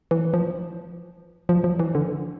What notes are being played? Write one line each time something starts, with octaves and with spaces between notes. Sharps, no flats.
E3
F3
F3
F3
E3
D3